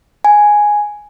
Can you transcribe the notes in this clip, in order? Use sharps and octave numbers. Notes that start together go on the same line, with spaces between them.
G#5